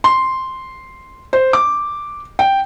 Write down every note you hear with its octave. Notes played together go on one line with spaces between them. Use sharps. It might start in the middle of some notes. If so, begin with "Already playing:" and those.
C6
C5
D6
G5